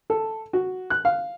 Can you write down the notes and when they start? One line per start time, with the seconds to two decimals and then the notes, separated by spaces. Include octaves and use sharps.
0.10 A4
0.53 F#4
0.90 F#6
1.05 F5